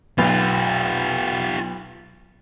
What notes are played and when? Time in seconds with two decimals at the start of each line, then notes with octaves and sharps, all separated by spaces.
0.18 B1 F4 G4